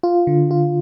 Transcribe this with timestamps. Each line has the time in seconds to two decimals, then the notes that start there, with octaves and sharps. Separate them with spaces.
0.03 F4
0.27 D3
0.51 F4